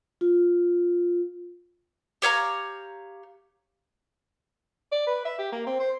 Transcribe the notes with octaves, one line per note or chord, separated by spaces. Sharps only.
F4
G4 C#5 F5 A#5
D5
B4
E5
G4
A#3
C4
C5